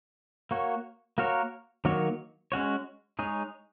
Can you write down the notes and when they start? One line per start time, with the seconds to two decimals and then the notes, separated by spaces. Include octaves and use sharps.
0.51 A#3 F#4 C#5
1.18 A#3 F#4 A#4 C#5
1.85 D#3 F#3 A#3 F#4 C#5
2.52 G#3 C#4 F#4 C#5
3.19 G#3 D#4 G#4 C#5